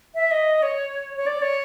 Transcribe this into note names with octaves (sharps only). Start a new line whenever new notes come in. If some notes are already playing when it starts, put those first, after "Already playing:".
E5
D#5
C#5
C#5
D5
C#5